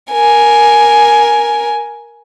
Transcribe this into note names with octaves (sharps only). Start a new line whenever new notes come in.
A#4 G#5